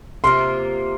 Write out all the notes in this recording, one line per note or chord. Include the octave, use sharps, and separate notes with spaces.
C3 A#3 F4 C6